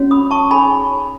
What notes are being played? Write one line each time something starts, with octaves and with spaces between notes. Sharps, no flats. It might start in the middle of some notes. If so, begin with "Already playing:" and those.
Already playing: C#4 F#4 C#5
B5 D#6
A5 C#6
D#4 G#4 C#5 G#5 B5